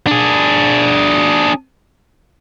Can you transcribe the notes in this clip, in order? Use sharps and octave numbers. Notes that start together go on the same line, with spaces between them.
D4 G#4